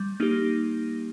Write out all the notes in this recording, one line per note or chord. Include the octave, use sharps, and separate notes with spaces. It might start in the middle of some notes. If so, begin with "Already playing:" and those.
Already playing: G3
A#3 D#4 G4